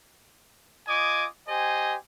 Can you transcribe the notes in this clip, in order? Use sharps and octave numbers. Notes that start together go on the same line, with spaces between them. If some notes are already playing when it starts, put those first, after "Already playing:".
F4 D#5 G#5 D6 D#6
G4 C5 D#5 G#5